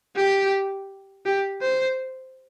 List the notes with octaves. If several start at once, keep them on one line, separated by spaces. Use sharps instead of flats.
G4
G4
C5